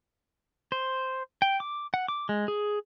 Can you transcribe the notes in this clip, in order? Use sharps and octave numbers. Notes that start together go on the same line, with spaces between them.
C5
G5
D6
F#5
D6
G#3
G#4